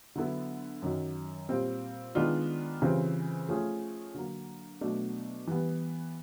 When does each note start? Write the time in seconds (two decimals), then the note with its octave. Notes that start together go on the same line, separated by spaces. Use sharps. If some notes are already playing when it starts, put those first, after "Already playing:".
0.16 D3 F#3 B3 E4 A4
0.82 F#2 D#3 F#3
1.49 A#2 G3 C4
2.15 D#3 G#3 B3 D4 F4
2.82 C#3 E3 G3 C4 F4
3.49 F3 A3 C#4 F4 G#4
4.14 D3 F#3 A#3
4.81 B2 F#3 A3 D4
5.47 E3 G3 B3